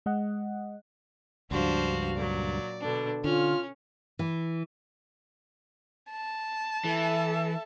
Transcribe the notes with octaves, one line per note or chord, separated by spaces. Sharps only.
G#3 D#5 F#5
C#2 G2 F3 D4 F#4 C5 F5
A#2 F#3 D5
B2 D3 D4
D3 C#4 F4 F6
E3
A5
E3 A4 E5